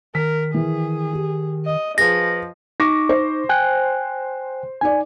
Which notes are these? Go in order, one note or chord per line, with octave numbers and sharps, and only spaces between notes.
D#3 A#4 B6
E3 G#4
G4
D#5
F3 G#4 B4 A#6
D#4 C#6 D6 A#6
C5
G5 G#5 F#6
D#4 D5 G#5